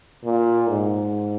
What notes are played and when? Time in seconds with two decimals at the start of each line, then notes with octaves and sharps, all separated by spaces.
0.24 A#2
0.69 G#2